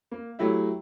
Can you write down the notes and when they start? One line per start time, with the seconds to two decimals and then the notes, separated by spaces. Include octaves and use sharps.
0.11 A#3
0.39 F#3 A3 E4 G4 E5